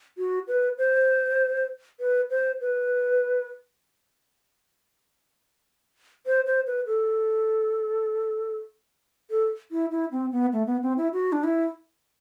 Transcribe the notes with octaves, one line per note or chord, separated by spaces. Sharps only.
F#4
B4
C5
B4
C5
B4
C5
C5
B4
A4
A4
E4
E4
C4
B3
A3
B3
C4
E4
F#4
D4
E4